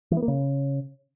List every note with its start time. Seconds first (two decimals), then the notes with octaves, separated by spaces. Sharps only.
0.11 E3
0.17 B3
0.22 A#3
0.28 C#3